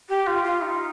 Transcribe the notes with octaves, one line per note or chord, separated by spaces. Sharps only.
G4
F4
F4
D#4